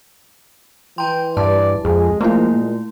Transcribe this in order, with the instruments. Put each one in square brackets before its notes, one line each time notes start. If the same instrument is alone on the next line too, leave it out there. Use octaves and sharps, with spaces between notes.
[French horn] E3 [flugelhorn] G5 [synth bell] A#5 C6
[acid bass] G2 [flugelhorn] D5 [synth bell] A5
[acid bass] F2 [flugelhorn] G#3 [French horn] G#4
[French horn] F3 [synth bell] A3 E4 [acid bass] A#3
[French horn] A#2